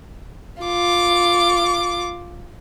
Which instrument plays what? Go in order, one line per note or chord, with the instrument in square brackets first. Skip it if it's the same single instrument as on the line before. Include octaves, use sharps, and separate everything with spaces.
[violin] F4 D6